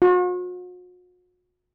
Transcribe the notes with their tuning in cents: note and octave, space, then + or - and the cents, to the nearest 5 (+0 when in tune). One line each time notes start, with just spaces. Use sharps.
F#4 -45